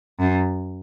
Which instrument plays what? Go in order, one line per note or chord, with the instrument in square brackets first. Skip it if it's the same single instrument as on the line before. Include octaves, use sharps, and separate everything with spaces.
[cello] F#2